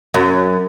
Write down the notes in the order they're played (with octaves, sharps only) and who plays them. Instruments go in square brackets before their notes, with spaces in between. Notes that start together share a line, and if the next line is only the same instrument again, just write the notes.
[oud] F#2